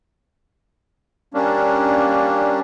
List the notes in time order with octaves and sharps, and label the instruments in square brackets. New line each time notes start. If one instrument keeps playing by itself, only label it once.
[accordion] G3 A#3 C#4 D4